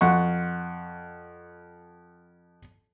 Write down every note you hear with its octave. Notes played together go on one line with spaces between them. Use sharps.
F2 F#5 C#6